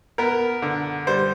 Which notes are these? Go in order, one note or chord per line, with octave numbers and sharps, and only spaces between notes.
B3 A#4
D3
G3 C5